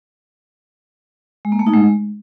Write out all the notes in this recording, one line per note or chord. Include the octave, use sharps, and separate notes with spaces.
G#3
A#3
A3
D#4
G#3